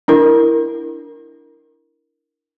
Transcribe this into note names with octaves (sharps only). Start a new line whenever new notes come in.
D4 E4 A#4